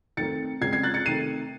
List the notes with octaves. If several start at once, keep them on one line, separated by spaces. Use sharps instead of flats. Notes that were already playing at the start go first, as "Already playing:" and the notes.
D#3 A3 C4 A6 C#7
C#3 G#3 C4 G#6 C7
G#6 C7
F#6 A6
A6 C#7
C3 D#3 A3 C7 D#7